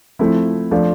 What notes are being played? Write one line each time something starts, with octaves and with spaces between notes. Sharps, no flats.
F3 A3 C4 E4
F3 A3 D4 F4